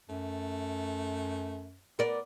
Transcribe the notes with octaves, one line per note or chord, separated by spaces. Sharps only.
F#2 A3
B3 A#4 D5